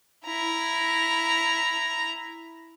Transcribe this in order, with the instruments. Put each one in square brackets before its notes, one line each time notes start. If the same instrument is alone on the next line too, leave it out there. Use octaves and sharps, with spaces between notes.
[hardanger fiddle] E4 A#5